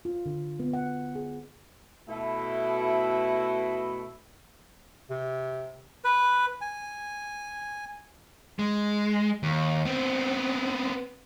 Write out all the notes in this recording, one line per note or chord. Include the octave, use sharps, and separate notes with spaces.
F4
D3
B3
F#5
G#4
B2 A3 E4
C3
B4
G#5
G#3
D#2
B3 C4